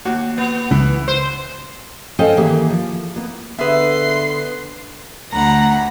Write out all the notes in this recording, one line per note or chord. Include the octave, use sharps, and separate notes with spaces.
D#2 F#4
B3
C#2 E3
C5
C#4 A4 C5 D#5 F5 G5
D#3 E3 A#3 G4 G#4
F3
A#3 B3
D3 B3 G#4 B4 E5 C6
D2 F#5 A#5 B5